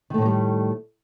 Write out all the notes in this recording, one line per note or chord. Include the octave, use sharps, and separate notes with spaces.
A2 D#3 G3 A3 A#3